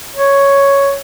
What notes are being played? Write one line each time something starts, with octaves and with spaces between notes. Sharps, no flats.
C#5